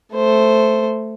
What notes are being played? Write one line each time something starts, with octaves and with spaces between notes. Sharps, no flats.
A3 C5